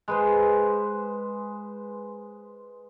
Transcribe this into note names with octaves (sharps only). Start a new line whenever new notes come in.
G#3 B4 C5